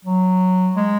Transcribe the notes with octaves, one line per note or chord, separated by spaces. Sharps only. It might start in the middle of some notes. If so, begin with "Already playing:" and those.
F#3
G#3